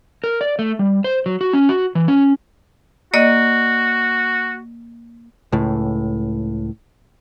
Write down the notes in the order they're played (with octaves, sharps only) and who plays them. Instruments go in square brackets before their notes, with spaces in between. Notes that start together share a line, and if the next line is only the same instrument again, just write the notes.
[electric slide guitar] A#4
D5
A3
G3
C5
F#3
F#4
C#4
F#4
E3
C#4
[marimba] A#3 D5 D#5 [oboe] F#4
[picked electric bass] C#2 A2